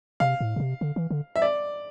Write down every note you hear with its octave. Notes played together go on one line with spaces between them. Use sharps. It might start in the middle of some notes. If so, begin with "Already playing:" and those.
C3 F5
A2
B2
C3
D3
E3
D3
E5
D5